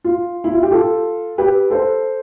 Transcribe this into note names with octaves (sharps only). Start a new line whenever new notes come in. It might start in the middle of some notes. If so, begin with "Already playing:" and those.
F4
E4
F4
G4
F4 A4
G4 B4
A4 C5